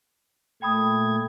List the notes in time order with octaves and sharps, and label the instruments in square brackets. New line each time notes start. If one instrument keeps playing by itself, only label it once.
[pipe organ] A#2 A3 G#6 [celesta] G5 B5 D#6